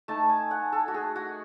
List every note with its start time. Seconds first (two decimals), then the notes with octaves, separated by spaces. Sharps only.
0.08 A3 D#4 A5
0.30 G#5
0.51 F#5
0.72 A4
0.88 F#4
0.94 G#4
1.16 F#4